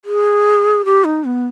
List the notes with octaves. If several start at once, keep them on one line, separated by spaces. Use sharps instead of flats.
G#4
G4
D#4
B3